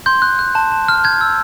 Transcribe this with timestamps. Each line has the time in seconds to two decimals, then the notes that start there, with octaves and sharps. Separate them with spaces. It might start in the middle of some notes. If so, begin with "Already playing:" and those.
0.06 C6 G6
0.22 F#6
0.39 F#6
0.55 A5
0.72 A5
0.88 F6
1.04 G6 G#6
1.21 E6